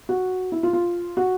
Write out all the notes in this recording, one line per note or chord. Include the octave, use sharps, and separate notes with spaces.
F#4
E4
F4
F4
F#4